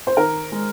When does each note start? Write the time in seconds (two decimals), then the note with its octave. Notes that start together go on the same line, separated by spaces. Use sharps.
0.07 C5
0.17 D#3 A#4
0.52 G#3